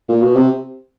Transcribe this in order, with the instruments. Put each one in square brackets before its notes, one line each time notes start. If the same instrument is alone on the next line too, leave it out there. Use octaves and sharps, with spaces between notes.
[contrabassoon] A#2
B2
C3